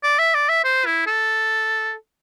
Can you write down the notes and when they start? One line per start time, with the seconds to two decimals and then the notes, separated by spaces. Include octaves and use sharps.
0.03 D5
0.19 E5
0.34 D5
0.49 E5
0.64 C5
0.86 E4
1.07 A4